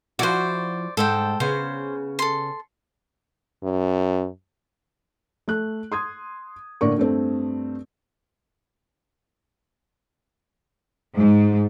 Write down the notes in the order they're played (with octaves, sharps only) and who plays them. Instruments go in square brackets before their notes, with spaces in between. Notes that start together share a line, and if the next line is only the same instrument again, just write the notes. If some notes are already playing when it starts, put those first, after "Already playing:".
[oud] F3 E4 F#4 [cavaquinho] C5 D5
[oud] G#2 [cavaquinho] A4 C5 G5
[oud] C#3 B3 [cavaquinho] C5
[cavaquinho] A4 C6
[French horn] F#2
[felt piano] A3 F#6
C6 D#6 G#6
A2 D3 A#3 A#4 D5 C#6
G2 A3 C4
[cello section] G#2